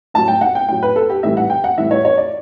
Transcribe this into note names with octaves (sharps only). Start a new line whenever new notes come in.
A2 F#3 A5
G5
F#5
G5
A2 F#3 G5
B4
A4
G4
A2 E3 G3 E5
F#5
G5
F#5
A2 E3 G3 E5
C#5
C#5
D5